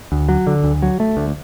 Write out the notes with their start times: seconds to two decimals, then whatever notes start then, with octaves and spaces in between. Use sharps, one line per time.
0.12 D2
0.29 F#3
0.47 D3
0.64 D2
0.82 F#3
1.00 A3
1.17 D2